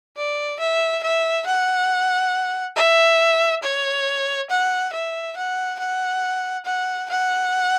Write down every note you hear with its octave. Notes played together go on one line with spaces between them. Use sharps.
D5
E5
E5
F#5
E5
C#5
F#5
E5
F#5
F#5
F#5
F#5